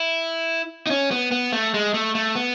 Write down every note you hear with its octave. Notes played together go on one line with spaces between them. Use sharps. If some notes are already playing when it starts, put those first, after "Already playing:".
Already playing: E4
D#4
C#4
B3
B3
A3
G#3
A3
A3
B3